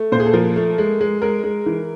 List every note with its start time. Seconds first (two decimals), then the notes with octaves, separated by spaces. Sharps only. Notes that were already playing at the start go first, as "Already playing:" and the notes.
Already playing: A3
0.12 A#2 C5
0.20 G#4
0.26 A4
0.34 F3 A#4
0.56 A3
0.78 G#3
1.01 G#3
1.22 G#3 A#4
1.44 G#3
1.66 E3